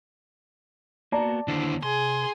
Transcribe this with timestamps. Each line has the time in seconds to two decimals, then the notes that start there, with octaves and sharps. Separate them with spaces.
1.12 A#3 B3 F#4 D5 A5 A#5
1.48 D#2 D3 D4 E4 C5
1.83 C3 G#4 C6